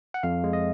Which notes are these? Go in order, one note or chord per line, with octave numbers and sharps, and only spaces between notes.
F#5
F2 F5
G#3
D#5